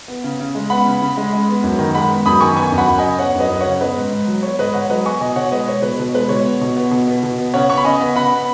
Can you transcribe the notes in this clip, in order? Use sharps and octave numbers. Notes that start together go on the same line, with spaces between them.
B3
C#3
C#3
G#3
B3 F#5 B5
C#3
C#3
G#3
G#3
B3
F#2
D#3
G#3 F#5 B5
B3
F#2 B5 D#6
D#3 G#5 C#6
B3 G#5 C#6
F#2
F#5 B5
F#2
D#5 G#5
C#3
B3 C#5 F#5
F#2 B4 D#5
F#2
C#3 C#5 F#5
B3 B4 D#5
G#2
G#2
F#3
B3 C#5
G#2 B4 D#5
G#2 C#5 F#5
F#3 B4 D#5
B3 G#5 C#6
B2 D#5 G#5
B2 C#5 F#5
G#3 B4 D#5
B3 C#5
B2 B4
B2
G#3 B4
B2 C#5
B3
B2
B3
B2
B3
B2
B3
C#3 C#5 F#5
B3 C#6
B5
C#3 D#5 G#5
B3
C#3 F#5 B5
B3